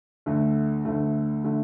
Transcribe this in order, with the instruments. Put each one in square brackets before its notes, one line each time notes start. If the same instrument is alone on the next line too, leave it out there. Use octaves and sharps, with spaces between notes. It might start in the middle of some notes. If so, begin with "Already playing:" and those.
[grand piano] D2 D3 A3
D2 D3 A3
D3 A3